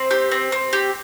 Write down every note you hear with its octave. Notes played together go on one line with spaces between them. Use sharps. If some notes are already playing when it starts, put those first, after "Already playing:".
Already playing: C4 C5
G4
C4
C4
G4